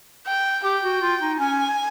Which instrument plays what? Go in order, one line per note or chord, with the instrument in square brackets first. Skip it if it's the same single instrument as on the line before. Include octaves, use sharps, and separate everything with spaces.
[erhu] G5
[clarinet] G4 [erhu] G5
[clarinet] F#4
F4
D#4
[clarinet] C#4 [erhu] G#5